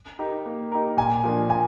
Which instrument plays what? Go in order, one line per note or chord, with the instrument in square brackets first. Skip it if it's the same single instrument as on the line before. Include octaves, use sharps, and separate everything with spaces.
[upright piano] D#4 G4 A#4
A#3
D#4 G4 A#4
[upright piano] A#2 [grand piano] G#5
[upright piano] F3 A#3 D4
[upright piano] A#2 [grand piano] G#5